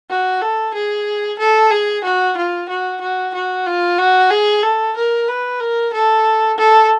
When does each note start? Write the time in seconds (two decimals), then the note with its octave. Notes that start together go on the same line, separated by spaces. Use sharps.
0.10 F#4
0.41 A4
0.74 G#4
1.39 A4
1.71 G#4
2.04 F#4
2.37 F4
2.69 F#4
3.01 F#4
3.34 F#4
3.66 F4
3.98 F#4
4.31 G#4
4.63 A4
4.96 A#4
5.28 B4
5.60 A#4
5.93 A4
6.58 A4